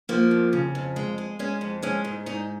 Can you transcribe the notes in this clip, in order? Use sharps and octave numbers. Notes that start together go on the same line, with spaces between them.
F3 A#3
F2
C#3
F2
G#3
G#3
G#3 C#4
F2
G#3 C#4
G#2
G#2 D#4